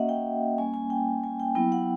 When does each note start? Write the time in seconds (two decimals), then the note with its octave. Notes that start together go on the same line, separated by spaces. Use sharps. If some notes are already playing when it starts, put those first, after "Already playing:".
Already playing: A#3 C#4 F#4 D#5 E5 F#5
0.09 G5
0.58 G3 A#3 C#4 G#5
0.74 G#5
0.90 G5
1.24 G#5
1.40 G5
1.55 F#3 B3 E4 G5
1.72 F#5